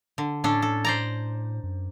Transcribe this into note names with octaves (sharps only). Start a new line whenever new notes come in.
D3
A2 C#4 D4 A4
A4
C5 D5 A#5
F#2